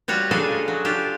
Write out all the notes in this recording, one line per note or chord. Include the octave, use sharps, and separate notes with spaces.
G3 F4 F#4 C#5
C#3 D4 G#4 A4 D#5 G#5
F#3
D4 F4 G4